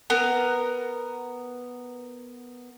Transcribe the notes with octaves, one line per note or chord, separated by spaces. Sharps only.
B3 A#4